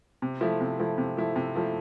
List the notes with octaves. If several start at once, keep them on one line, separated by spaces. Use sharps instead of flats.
C3
F3 A3 E4
C3
F3 A3 E4
C3
F3 A3 E4
C3
F3 A3 E4